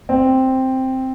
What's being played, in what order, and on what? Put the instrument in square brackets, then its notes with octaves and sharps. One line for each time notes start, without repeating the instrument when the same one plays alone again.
[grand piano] C4